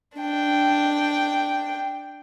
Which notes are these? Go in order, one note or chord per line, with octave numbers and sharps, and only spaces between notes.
D4 G5